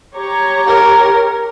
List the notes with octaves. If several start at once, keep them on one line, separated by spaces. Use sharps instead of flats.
G4 C#5 A#5
A#4